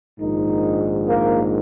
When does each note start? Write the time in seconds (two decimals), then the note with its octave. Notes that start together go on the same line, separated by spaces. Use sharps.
0.20 A#1 G#2 D#3 D#4
1.07 A#3